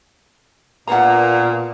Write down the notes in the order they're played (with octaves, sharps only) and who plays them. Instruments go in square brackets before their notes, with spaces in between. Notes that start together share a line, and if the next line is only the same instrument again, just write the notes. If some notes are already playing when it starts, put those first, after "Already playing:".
[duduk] A#2 [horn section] A#3 B3 D4 [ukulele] F#5 A#5